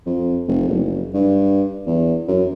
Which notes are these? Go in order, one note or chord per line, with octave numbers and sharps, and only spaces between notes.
F2
F1
F#1
G2
E2
F#2